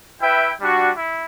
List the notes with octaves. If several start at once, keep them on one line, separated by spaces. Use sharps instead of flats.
E4 B4 E5 G5
G3 D4 F#4
E4